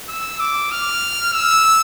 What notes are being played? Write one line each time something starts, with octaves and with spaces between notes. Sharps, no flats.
E6
D6
F6
E6